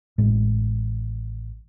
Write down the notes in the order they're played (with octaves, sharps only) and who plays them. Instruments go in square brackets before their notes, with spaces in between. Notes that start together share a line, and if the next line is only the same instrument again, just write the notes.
[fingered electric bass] A1 A2 G#3